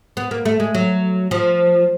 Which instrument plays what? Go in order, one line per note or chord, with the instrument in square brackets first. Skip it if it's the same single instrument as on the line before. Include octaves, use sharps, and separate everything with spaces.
[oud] B3
A#3
A3
G#3
F#3
F3